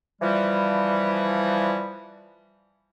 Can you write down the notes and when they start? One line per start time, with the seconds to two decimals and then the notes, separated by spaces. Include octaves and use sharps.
0.22 E3 F3 G3